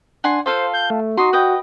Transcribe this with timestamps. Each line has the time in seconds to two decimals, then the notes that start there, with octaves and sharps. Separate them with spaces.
0.24 D4 F#5 G#5 C6
0.46 F4 A4 C5 F5
0.74 G6
0.90 A3
1.17 D#4 F#4 C6
1.33 B4 D#5 G5